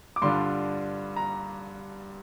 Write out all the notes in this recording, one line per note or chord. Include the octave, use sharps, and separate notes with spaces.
D6
G2 D3 G3 D4 F4 C6
A#5